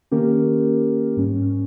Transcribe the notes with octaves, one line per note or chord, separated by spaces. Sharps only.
D#3 A#3 C#4 G4 A#4
G#2 G3 C#4